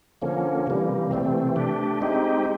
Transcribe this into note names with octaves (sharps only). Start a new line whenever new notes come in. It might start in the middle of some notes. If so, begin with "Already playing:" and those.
D3 F3 A#3 C#4
C3 E3 G3 A#3
C3 E3 A3 C4
A3 D4 G4
G#3 C4 D#4 G4